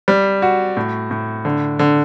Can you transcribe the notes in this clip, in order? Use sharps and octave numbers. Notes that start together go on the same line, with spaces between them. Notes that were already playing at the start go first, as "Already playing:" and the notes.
G3
F#4
A2
A2
D3
D3